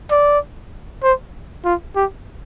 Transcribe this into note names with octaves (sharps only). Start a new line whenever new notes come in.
D5
C5
F4
G4